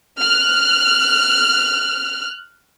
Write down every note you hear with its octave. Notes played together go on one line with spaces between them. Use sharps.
F6 F#6